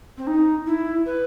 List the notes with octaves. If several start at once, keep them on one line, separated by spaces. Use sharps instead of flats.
C4
D#4
E4
B4